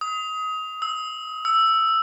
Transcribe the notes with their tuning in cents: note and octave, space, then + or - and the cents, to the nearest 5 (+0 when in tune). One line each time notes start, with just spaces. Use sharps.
D#6 +25
E6 -15
E6 +5